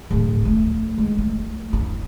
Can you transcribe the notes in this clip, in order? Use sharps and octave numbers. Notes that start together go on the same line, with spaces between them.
D1
A3
G#3
A3
E4